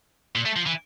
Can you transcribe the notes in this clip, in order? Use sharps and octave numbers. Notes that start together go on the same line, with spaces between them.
A#2
A3
F3
E3